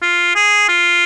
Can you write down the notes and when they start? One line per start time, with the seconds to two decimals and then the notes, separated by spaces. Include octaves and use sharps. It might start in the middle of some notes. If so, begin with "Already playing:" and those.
0.02 F4
0.35 G#4
0.69 F4